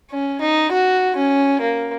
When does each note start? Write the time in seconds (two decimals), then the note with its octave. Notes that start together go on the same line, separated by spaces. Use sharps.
0.11 C#4
0.41 D#4
0.72 F#4
1.16 C#4
1.61 A#3